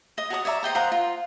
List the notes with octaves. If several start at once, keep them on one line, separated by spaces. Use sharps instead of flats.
D#5 D#6
F#4 C#5 A5 D#6
C#5 D5 E5 A#5
C5 D#5 G5 A#5
C5 F5 F#5 A#5
F4